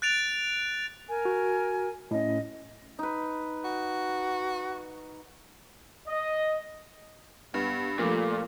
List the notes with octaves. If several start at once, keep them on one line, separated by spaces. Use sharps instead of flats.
F#6 A6 D7 F7
A#4 G#5
F#4
A2 C#4 D#5
D#4 B4
F#4
D#5
G2 B3
A#2 F3 A3 F4